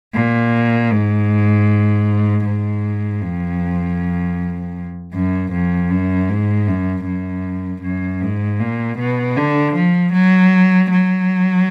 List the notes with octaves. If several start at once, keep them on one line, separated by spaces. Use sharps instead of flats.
A#2
G#2
G#2
F2
F#2
F2
F#2
G#2
F#2
F#2
F#2
G#2
A#2
B2
D3
F3
F#3
F#3